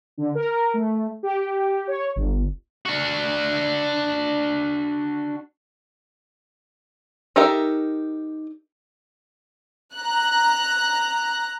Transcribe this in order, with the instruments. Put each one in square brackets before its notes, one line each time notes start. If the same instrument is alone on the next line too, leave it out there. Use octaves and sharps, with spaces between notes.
[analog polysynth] D3
A#4
A3
G4
C#5
G1
[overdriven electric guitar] D4 F#4
[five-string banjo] D#4 G4 A4 A#4 E5
[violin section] A#5 F#6